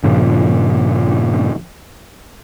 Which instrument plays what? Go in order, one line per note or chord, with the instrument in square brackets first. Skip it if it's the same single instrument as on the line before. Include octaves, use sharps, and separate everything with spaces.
[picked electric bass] G2 A#2 C#3 F3